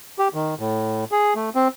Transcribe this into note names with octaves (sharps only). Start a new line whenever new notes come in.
G4
D#3
A2
G#4
A3
C4